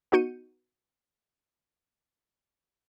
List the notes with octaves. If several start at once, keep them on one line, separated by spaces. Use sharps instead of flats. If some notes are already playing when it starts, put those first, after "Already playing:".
B3 D#4 F#4 G6 C#7 D#7